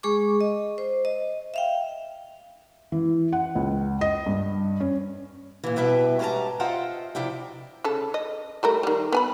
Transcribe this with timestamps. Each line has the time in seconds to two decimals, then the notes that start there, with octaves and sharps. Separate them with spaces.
0.03 G#3 G#4 C#6 D6
0.41 D#5
0.78 C5
1.05 D#5
1.54 E5 F5 G5
2.92 E3
3.33 F#5
3.55 C#2
4.01 D#5
4.26 G2
4.80 C#4
5.64 A#2 E3
5.76 B2 G3 E4 B4 E5 G5
6.19 G#2 C#4 G4 B4 A5 A#5
6.60 F4 C5 D#5 E5 F#5 G5
7.15 C3 F3 E4 D5 G5
7.84 C#3 A4
8.14 D#5
8.63 G3 A3 A#4
8.83 D#3 G3
9.12 B3 G#5 B5